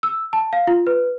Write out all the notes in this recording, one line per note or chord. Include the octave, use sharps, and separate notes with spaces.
E6
A5
F5
F4
B4